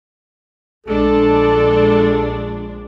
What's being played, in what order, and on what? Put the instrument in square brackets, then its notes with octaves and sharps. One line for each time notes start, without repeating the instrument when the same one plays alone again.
[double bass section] A#1 [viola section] G#3 D4 [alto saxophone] A4